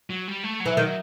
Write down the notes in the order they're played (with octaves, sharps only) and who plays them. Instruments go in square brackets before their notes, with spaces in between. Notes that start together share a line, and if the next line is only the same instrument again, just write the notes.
[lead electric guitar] F#3
G3
A3
F#3
[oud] E3
[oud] D#3 [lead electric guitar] F#3